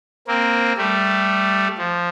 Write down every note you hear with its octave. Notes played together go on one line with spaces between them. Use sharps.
A#3 C4
G3 A3
F3